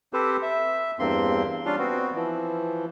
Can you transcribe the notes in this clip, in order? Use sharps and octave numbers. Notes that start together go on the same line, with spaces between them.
C4 G4 A4 B4 C5
E5
E2 G2 A#3 C4 C6
G3 C#4 D4 F4 F5
B3 C4 F#4
E3 F3